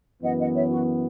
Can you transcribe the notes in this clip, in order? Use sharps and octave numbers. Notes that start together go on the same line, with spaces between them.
F#2 E3 B3 D#5 F#5
D#5 F#5
C#5 E5
F#4